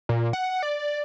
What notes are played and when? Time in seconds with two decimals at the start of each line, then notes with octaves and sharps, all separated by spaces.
0.09 A#2
0.33 F#5
0.63 D5